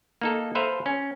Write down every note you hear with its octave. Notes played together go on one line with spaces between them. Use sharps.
A#3 D#4 A4
A4 B4 C5 E5 F5 A#5
C#4